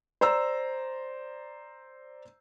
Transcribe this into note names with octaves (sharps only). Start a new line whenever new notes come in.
C5 D5 A#5 E6